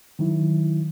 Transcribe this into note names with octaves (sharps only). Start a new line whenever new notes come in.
D#3 F#3 E4